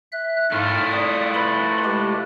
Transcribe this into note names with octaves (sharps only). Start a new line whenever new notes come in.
E5 F#6
G#2 A3 E4 F4 F6
D5 D#6
B4 B5 C6
G#3 G4 B4